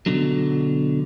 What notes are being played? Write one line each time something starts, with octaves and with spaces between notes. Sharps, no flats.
B2 D3 F#3